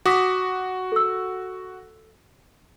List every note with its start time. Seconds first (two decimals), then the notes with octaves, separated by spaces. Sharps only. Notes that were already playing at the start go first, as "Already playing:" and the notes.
0.06 F#4 D6 D#6 B6
0.92 A4 E6